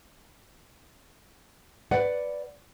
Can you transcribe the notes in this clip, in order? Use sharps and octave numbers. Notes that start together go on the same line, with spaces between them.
B4 D5 F#5